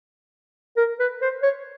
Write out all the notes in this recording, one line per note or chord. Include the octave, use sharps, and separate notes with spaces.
A#4
B4
C5
C#5